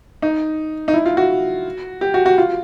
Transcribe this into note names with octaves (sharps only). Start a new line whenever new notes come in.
D#4
D#4
E4
F4
F#4
G4
F#4
F#4
F4